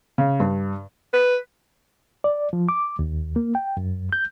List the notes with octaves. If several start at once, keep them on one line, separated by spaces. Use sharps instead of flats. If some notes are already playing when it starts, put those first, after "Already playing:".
C#3
G2
B4
D5
F3
D6
D#2
A#3
G5
F#2
G6